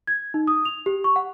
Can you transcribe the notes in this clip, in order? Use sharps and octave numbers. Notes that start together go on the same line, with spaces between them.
G#6
D#4
D#6
F7
G4
C#6
F#5